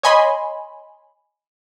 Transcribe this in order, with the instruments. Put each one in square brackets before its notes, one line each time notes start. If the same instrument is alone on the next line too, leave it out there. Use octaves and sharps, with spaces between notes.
[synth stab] C#5 D#5 G#5 B5 C6